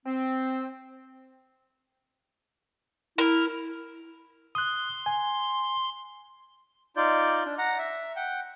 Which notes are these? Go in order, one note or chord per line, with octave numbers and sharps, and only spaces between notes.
C4
E4 A#4
C6 D#6 F#6
G#5
D#4 F4 D5 G6
D4
F#5 A#5
E5
F#5 G5